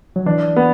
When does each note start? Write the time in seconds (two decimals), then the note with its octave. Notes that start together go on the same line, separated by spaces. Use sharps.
0.16 F#3
0.26 E3 D4
0.56 B3